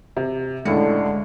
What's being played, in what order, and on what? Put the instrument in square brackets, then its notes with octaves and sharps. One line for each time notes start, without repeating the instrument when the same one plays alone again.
[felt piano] C3
[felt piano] C#2 A2 C#7 [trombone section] D3 [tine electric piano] G#3